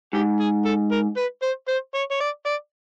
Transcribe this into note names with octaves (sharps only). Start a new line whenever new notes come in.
G#2 G4
G#4
A4
A#4
B4
C5
C5
C#5
C#5
D5
D5